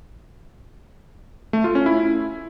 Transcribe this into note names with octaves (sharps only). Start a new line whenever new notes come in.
A3
F4
C#4
E4